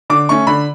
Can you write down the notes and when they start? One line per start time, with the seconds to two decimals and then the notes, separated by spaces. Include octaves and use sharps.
0.10 D3 D6
0.29 A3 C#4 C#6
0.47 D3 B5